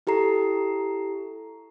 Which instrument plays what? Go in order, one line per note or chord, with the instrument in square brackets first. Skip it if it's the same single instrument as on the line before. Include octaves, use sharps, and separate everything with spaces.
[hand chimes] E4 G4 A4 A#5 C7